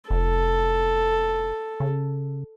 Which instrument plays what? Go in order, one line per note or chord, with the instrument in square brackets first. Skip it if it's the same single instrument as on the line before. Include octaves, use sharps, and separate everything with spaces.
[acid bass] F1 [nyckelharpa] A4
[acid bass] C#3